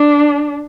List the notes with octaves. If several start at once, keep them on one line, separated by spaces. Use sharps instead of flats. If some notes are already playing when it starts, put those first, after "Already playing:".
Already playing: D4